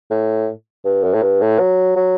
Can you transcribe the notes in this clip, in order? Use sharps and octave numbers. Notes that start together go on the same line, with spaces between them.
A2
G2
F#2
A2
G2
A2
F#3
F#3